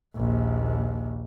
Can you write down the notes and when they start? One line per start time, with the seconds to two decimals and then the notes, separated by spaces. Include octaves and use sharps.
0.16 A#1 D#2